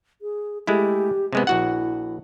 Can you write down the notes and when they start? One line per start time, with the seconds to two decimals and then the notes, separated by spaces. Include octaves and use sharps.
0.22 G#4
0.67 G#3 A3 E4 G4
1.33 C3 G#3 B3
1.47 A#1 E4 F#4 F#5